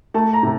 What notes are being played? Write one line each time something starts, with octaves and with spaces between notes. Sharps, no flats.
A3 A5
A#5
C3